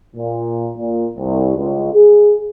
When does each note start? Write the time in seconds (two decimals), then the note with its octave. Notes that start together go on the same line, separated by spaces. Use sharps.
0.16 A#2
0.77 A#2
1.18 C2
1.57 C#2
1.92 G#4